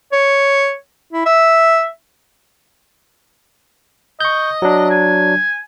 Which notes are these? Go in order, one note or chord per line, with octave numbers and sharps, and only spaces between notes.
C#5
E4
E5
D#5 C#6 G6
F#3 D4
G#5